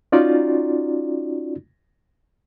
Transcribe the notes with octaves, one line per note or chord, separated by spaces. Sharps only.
C#4 D#4 F4 F#4 D5